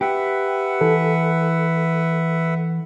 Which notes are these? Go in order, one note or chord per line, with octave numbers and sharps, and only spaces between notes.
G4 B4 E5 F#5
E3 A4